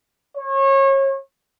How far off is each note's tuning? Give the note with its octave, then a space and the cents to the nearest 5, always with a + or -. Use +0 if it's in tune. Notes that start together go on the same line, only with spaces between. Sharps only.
C#5 -30